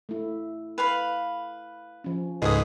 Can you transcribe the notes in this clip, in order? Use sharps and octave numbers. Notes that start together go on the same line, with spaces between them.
A3 E4
B4 F5 B5
F3 C#4
C#2 G#2 G#4 A4 B4 D#5 D#6